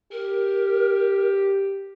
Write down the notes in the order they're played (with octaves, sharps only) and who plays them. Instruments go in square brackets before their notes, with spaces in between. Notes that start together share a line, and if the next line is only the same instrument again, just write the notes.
[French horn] G4 [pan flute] A#4